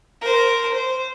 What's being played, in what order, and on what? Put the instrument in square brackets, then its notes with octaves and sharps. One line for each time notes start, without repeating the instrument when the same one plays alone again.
[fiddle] A#4 C5
C5